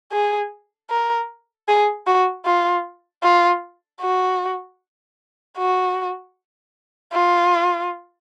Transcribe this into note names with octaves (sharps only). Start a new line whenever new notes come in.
G#4
A#4
G#4
F#4
F4
F4
F#4
F#4
F4